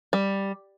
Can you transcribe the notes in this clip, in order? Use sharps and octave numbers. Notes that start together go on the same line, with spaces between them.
G3